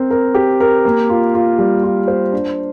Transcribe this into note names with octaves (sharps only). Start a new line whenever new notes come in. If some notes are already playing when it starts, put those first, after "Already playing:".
Already playing: C4 A#4
A#4
G4
A#4
A#3
F4
F4
G3
F4
C5
D4